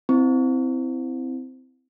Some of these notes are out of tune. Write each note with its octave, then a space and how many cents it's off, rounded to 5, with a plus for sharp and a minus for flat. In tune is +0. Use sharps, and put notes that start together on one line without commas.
C4 -15 E4 +0